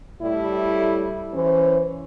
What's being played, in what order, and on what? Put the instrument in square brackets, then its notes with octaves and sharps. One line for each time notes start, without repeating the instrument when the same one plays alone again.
[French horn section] A2 G3 E4
E3 C#4 C5